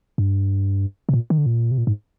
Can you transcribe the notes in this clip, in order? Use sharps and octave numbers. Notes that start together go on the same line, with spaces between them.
G2
C3
A#2
D#3
D3
A#2
C3
A#2
G#2